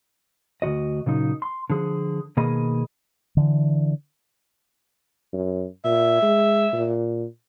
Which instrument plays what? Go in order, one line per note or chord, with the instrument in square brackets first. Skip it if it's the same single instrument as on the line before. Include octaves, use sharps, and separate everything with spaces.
[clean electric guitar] D2 G2 F#4 D#5
A#2 C#3 F#3 D#4
C6
D3 F3 G#4
B2 D#3 A#3 G#4 D#5 B5
[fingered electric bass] D3 E3
[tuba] F#2
[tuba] A#2 [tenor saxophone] E5
[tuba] G#3
A#2